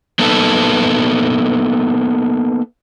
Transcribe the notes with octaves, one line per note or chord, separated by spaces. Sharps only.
A#3 B3 D#4 A4 B4